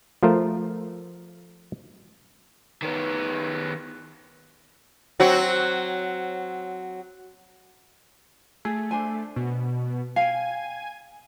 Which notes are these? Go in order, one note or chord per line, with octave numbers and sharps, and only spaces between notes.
F3 A3 F4 A#4 C5
D#3 B3
F#3 C4 F#4
A3 G#4
D4 C5 G#5
B2
F5 G5 G#5